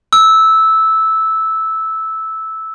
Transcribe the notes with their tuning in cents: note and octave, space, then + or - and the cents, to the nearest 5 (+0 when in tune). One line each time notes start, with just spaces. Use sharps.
E6 -10